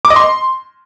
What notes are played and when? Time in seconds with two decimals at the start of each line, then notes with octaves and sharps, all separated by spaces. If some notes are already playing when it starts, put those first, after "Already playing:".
0.05 D6
0.10 D#5
0.16 C6